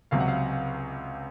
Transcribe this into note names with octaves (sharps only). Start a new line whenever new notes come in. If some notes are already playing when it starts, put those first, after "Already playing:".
C#2 C3 F#3 F5
F#5
F5